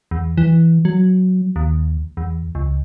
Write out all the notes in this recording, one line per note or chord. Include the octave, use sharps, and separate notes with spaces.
E2
E3
F#3
D#2
E2
C#2